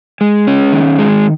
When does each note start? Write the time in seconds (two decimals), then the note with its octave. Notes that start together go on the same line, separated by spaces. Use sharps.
0.21 G#3
0.47 C#4
0.73 D#3
0.99 G#3